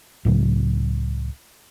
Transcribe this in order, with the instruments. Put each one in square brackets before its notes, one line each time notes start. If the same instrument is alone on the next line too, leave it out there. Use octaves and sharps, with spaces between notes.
[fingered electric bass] C#2 A2 C#3 F#3